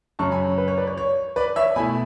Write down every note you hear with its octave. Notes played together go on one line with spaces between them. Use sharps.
F#2 C#3 F#3 A5 C#6
G#5 B5
C#5
B4
C#5
B4 D5
C#5
C#5
B4 D5
C#5 E5
B2 A3 E4 G#5 B5